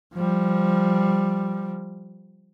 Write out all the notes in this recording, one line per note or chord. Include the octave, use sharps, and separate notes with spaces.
F3 G3